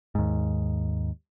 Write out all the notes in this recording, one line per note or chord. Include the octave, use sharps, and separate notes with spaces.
D#2 G#2